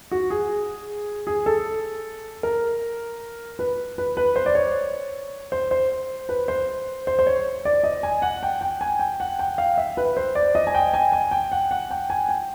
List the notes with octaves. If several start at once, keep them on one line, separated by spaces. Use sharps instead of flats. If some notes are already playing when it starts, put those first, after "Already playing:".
F#4
G#4
G#4
A4
A#4
B4
B4
B4
C5
D5
C#5
C5
C5
B4
C5
C5
C5
C#5
D5
D#5
G#5
F#5
G5
G5
G#5
G5
F#5
G5
F5
E5
B4
C5
D5
D#5
G#5
G5
G#5
G#5
G5
F#5
F#5
G5
G#5
G5